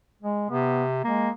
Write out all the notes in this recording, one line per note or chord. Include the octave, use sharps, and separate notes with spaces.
G#3
C3 B3
G#3 A#3